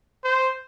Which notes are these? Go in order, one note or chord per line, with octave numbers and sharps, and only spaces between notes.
C5